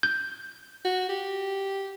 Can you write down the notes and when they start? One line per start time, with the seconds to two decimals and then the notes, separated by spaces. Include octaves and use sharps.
0.03 G6
0.85 F#4
1.09 G4